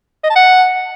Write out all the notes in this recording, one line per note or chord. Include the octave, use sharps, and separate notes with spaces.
D#5
A5
F#5